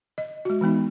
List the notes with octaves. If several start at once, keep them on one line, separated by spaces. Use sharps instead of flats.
D#5
G#3 F#4
E3 G#3 B3 D#4